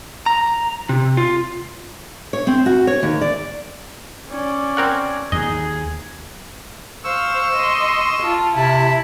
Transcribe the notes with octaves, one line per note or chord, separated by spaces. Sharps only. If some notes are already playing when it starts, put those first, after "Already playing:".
A#5
C3
F4
C#5
C4
F#4
C#5
D#2
D5
C#4 D5
C4 A#4 F#5
D#2 G#4 D#5
C5 F5 C#6 E6
D#5 C6
F4 A5
C3 E4 A5 B5